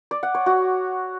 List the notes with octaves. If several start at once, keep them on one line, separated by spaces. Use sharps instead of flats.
D5
F#5
C#5
F#4